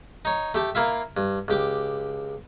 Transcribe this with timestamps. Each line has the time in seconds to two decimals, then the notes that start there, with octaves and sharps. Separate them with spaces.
0.25 D#4 C#5
0.54 A3 G4 A5
0.75 A#3 E4 F4 E5
1.17 G2
1.48 C#2 G4 D6